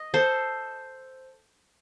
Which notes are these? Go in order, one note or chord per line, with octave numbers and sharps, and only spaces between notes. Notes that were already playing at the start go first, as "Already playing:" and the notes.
Already playing: D#5
A4 C5